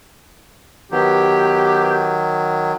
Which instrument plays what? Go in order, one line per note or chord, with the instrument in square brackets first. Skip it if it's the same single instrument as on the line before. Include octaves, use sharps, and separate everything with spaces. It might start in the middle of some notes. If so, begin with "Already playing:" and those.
[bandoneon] D#3 F#3 [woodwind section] B3 G4